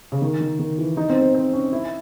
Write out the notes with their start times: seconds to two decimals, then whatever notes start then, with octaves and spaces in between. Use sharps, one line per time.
0.12 C#3
0.22 D#3
0.41 D#3
0.59 D#3
0.79 E3
0.97 D#4
1.10 C4
1.22 C4
1.34 C4
1.53 C#4
1.73 E4